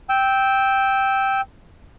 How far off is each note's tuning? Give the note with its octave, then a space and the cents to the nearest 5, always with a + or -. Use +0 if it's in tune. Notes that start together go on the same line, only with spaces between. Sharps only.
G5 +0 E6 -15